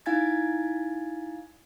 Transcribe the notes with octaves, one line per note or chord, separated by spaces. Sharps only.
D#4 E4 F5 G#5 G#6 A6